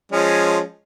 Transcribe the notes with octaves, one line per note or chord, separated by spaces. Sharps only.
F3 G#3 C#4